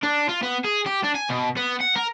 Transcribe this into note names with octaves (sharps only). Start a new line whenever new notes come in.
D4
F4
B3
G#4
G4
D4
G#5
B2
B3
F#5
A#4